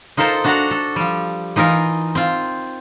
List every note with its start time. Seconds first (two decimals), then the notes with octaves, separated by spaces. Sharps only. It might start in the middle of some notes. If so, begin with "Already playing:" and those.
0.17 D#4 F4 A4 A#4 C5
0.44 D4 F#4 A4 F#5 A#5
0.71 A4
0.96 F3 G3
1.56 E3 D#4 F4 A#4
2.15 C4 F4